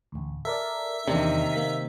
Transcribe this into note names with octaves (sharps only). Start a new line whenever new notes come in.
A1 D2
A4 A#4 D5 E5
E2 C3 D#3 A#3 D4
A#3 B6